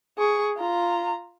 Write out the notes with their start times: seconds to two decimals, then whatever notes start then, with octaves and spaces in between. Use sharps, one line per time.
0.18 G#4 C#6
0.57 F4 A#5